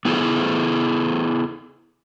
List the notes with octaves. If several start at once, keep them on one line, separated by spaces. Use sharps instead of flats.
B3 E4 F#4 G#4 A4